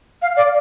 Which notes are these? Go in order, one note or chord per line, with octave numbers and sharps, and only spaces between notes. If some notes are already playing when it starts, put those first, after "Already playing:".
F5
D5